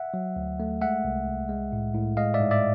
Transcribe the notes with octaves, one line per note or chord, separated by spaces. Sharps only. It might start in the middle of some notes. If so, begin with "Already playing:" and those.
Already playing: E5 F#5
F#3
D2
A3
G#3 E5 F#5
C2
C2
G#3
A2
A2
G#3 D#5 F5
D5 E5
G#2
D5 E5